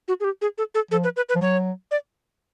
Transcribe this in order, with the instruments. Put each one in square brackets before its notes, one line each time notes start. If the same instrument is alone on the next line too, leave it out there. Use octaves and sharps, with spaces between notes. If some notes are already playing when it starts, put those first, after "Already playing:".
[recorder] F#4
G#4
G4
G#4
A4
A4
[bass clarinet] F3 [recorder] A4
[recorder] B4
B4
B4
[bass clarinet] F3
[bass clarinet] F#3 [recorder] C#5
[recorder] D5